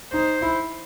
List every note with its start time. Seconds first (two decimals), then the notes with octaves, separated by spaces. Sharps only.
0.13 D#4 C5
0.42 E4